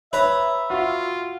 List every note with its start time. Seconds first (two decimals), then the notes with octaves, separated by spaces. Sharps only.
0.13 B4 C#5 E5 A#5
0.70 F4 F#4